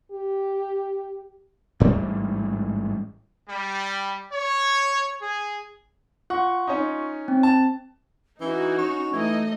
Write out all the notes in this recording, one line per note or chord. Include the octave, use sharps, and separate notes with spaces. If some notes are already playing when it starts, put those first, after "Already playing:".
G4
A1 G#2 G3
G3
C#5
G#4
F4 F#5 C#6
C#4 D#4
C4
A5
E3 C#4 D#4 F#4
C#5
E3 A3 D#4 D#5